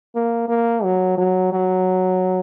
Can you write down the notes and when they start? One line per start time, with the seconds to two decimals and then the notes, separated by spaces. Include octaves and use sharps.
0.15 A#3
0.48 A#3
0.84 F#3
1.18 F#3
1.52 F#3